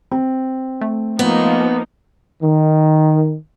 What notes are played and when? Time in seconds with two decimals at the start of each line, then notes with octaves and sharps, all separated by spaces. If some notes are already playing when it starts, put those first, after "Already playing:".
0.11 C4
0.81 A3
1.19 F3 A#3 B3 D#4
2.42 D#3